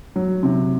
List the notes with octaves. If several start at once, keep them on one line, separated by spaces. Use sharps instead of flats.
F#3
C3